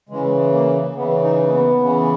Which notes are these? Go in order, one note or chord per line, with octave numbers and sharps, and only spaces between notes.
C#3 E3 G#3
A#3
C#3 E3 B3
D#4
A#3
B3
C#3 E3